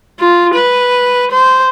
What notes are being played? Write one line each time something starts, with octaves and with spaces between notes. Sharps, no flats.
F4
B4
C5